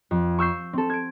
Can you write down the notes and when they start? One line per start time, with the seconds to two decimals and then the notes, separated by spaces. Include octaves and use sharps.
0.11 F2
0.39 C#6 E6 G6 C7
0.73 C4 A4
0.90 G#6 D7